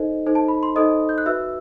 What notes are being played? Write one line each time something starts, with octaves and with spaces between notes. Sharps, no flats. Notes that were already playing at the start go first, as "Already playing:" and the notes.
Already playing: D#4 A4 C5 D#5
D#4 A4 C5
A5
B5
C6
D#4 A4 C5 D#5 D#6
G6
F#6
F#4 B4 E5 E6